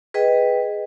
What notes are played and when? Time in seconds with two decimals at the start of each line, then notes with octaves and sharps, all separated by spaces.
0.14 G#4 B4 D#5 G5